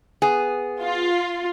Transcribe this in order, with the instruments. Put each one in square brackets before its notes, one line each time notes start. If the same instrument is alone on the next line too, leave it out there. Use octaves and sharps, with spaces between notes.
[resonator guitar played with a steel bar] B3 G#4
[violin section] F4